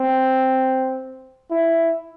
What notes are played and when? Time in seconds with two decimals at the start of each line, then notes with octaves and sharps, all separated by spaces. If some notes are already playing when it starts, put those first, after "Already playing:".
Already playing: C4
1.51 E4